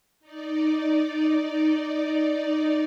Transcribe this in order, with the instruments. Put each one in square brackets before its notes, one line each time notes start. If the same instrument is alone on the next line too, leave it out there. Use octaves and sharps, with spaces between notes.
[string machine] D#4 D5